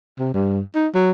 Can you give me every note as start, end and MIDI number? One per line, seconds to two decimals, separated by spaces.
0.19 0.29 48
0.34 0.60 43
0.75 0.87 63
0.95 1.12 54